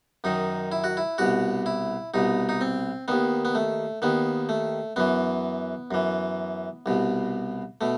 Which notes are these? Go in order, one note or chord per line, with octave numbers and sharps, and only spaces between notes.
F#2 D#3 D#4
E4
F#4
E4
C2 B2 F#4
E4
C2 B2 D#4
D#4
C4
D#2 D#3 B3
B3
A3
D#2 D#3 B3
A3
F#2 E3 B3
F#2 E3
C2 B2
B2 A3